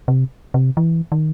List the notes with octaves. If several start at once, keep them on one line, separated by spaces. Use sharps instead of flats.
C3
C3
E3
D#3